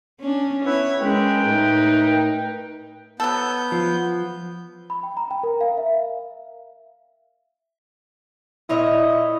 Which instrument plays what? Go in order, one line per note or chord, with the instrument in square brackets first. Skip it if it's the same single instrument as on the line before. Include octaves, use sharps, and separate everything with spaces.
[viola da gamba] C#4 D4
[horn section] B3 E4 B4 [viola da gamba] C#5
[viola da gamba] G#3 C#4 [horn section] A#4 B4 G5
[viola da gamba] A2 D#4
[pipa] F#3 A4 [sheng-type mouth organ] B3 G6
[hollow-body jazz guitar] F3
[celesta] B5
G5
A#5
G5
A#4
F5
E5
[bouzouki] A#2 C#5 D#5 [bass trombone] E4